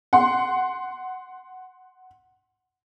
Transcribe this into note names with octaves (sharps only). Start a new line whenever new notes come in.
F#5 C6